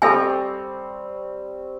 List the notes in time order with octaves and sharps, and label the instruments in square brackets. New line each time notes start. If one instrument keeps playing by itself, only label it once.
[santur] G3 C4 C#6 [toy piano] A4 E5 G#5